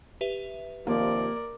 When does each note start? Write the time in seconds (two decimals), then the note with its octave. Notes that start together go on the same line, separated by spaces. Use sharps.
0.21 G4 B4 E5
0.87 D#2 C3 F3 A#3 A#4 D5